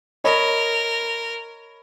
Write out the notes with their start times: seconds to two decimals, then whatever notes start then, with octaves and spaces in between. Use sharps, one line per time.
0.24 A#4 C#5 D#5 B5